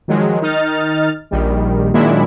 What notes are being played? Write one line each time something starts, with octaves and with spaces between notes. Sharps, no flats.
D#3 F3 F#3 G#3
D#3 D#4 F6 A6
A#1 D#3 G3
A#2 D#3 F#3 G#3 D4 E4